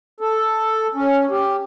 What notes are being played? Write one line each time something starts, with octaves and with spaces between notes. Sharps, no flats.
A4
C#4
G4